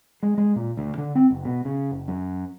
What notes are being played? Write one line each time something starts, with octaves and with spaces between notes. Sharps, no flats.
G#3
G#3
A#2
D2
D3
C4
F#1
B2
C#3
F#1
F#2